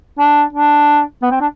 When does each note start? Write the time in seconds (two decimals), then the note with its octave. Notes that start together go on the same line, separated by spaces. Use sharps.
0.18 D4
0.53 D4
1.22 B3
1.31 C4
1.40 D4